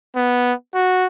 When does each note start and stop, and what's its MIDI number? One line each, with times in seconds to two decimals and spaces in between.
0.16 0.53 59
0.75 1.06 66